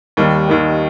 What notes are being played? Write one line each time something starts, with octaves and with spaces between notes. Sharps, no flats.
D#2 D#3 G3
D#2 D#3 G3